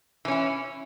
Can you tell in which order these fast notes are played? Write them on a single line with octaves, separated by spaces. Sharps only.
E3 C#4 E4